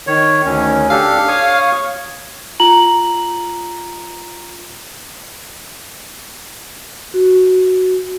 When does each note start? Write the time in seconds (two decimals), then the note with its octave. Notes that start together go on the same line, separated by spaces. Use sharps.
0.07 D#3 C#5
0.45 D2 D#3 C#4
0.90 D4 G4 A4 F5
1.28 C#5 C#6 D#6
2.60 F4 A#5 F#7
7.14 F#4